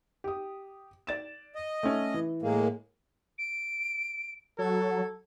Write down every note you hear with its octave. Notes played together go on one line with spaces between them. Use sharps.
G4 D#6
D5 A6 E7
D#5
A3 C#4
E3
A2 G#3 A#3
D7
F#3 A4 G#6